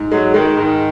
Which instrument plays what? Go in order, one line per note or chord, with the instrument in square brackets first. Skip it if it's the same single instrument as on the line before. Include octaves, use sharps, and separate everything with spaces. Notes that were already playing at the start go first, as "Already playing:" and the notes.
Already playing: [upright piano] G#2
[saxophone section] F#3 [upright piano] G#3
[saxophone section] D#3 [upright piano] G#3
[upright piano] G#2 [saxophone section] D#3